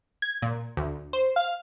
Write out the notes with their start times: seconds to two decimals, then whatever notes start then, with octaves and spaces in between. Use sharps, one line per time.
0.22 G#6
0.42 A#2
0.77 D2
1.13 C5
1.36 F5